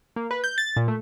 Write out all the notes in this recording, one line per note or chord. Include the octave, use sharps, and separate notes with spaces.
A#3
B4
G6
A6
A#2
A3